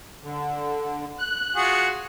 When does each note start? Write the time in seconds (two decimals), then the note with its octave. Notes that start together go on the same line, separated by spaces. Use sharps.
0.23 D3
1.19 F#6
1.56 F4 F#4 G#4